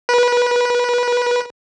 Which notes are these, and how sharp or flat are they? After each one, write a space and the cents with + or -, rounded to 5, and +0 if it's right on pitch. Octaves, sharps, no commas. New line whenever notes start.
B4 -25